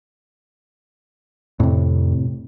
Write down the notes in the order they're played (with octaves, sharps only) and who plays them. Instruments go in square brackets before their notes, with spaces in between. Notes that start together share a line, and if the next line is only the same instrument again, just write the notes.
[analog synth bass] F2 [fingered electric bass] A2 C3